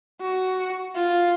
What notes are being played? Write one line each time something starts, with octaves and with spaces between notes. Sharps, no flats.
F#4
F4